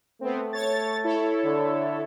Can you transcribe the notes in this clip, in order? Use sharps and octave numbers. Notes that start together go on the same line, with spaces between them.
A3 B3 C4
C#5 A6
E4 A4 C#5
D3